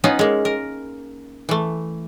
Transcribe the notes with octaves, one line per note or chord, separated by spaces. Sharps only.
B3 C#4 D#4 F4 B4
G#3 A#3
A#4
E3 A3